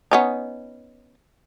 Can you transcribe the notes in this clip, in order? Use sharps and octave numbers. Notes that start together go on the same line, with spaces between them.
B3 C#4 D#4